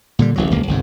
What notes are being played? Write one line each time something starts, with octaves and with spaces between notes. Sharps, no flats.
A#2 D3 G3
D1 A1 F#3
D1 C#2 A#3
G1 C2 G#2